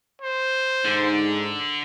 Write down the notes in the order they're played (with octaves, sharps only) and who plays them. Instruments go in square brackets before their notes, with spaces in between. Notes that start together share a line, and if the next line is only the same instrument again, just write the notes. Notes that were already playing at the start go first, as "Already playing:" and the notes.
[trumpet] C5
[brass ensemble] G#2 [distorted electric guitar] D3